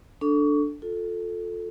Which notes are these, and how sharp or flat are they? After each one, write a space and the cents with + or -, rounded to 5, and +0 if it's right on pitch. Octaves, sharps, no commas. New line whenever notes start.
D4 +0 A4 +0 C#6 +25
F4 +25 A4 +0